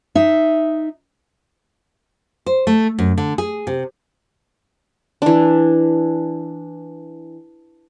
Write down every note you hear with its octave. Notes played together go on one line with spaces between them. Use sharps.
D#4 E5
C5
A3
F#2
D3
G#4
C3
E3 D4